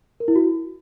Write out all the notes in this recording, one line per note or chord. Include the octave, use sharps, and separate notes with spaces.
A#4
E4
F#4